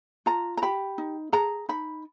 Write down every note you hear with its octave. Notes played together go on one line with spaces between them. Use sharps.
F4 A#5
A#5
G4 B5
D#4
G#4 A#5
D#4 B5